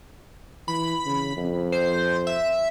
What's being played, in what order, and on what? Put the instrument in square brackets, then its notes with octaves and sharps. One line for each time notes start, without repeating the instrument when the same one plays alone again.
[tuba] E3 [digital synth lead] B5
[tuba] C#3
F2
[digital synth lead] C5
E5